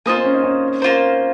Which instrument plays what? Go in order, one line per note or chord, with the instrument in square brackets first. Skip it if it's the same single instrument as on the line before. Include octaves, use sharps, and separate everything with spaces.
[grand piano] A#3 [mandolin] F4 C5 D#5 G#5
[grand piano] C4
C#4
D#4
C#4
[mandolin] A#3 F4 C5